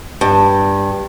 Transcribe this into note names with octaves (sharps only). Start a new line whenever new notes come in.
G2